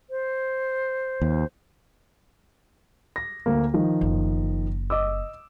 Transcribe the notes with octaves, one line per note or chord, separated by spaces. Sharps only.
C5
D#2
A#6
D2 A#3
D#3 F3
F#1
D#5 D6 E6